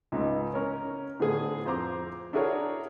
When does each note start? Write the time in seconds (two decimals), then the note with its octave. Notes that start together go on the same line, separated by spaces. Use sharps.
0.12 C#2 G#2 C#3 G#3 D#4
0.54 C#4 A#4 C#5
1.20 A2 D3 B3 C4 G#4
1.66 F2 C5 A#5 D6
2.33 D4 E4 F#4 G#4 A#4 C#5